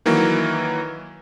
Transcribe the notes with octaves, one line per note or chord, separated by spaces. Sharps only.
D#3 E3 F#3 A#3